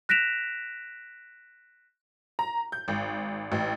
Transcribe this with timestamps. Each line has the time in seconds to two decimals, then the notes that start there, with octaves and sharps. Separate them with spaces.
0.09 F#6 A#6 B6 D7 E7 F7
2.39 A#5
2.72 G6
2.88 G#1
3.52 A1